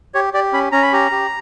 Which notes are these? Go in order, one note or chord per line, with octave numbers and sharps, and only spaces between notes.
G4 C#5
G4 D5
C#4 B5
C#4 A#5
B5
G4 A#5
G4